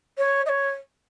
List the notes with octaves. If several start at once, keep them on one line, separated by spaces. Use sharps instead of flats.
C#5
D#5
C#5